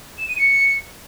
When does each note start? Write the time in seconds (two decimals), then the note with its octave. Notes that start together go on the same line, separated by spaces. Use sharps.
0.18 E7
0.28 D#7
0.39 C#7